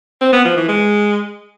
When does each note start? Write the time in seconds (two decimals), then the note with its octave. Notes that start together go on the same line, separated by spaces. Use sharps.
0.21 C4
0.33 B3
0.45 F3
0.56 E3
0.68 G#3